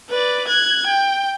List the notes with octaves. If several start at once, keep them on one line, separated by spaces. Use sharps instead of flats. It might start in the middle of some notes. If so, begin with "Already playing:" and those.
B4 D5
F#6 G#6
G5